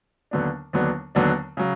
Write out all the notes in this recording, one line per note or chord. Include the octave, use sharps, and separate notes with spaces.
D#2 D3 F#3 B3 D4
D#2 D3 F#3 B3 D4
D#2 D3 F#3 B3 D4
C#3 F#3